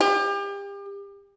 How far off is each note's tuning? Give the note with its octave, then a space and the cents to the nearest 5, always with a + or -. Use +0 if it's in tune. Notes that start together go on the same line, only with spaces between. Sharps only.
G4 +35